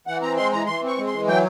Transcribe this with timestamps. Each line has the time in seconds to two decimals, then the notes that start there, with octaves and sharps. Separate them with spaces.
0.07 E3 F#5
0.22 C4 A#5
0.37 G#3 C6
0.52 E3 A#5
0.67 E3 C6
0.83 C4 C#6
0.98 G#3
1.07 C6
1.13 E3
1.27 F#3 G5